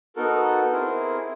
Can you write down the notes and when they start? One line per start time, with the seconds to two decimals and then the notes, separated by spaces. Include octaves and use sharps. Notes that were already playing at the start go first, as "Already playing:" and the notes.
0.16 B3 D#4 F#4 A4 A#4
0.72 C4 E4 G#4 A#4